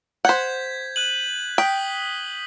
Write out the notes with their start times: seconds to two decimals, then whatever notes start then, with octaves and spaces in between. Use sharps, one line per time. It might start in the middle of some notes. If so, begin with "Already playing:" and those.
0.25 C5 F#5 G6 G#6 B6
0.96 F#6 D#7 F#7
1.58 G5 D#6 B6 G7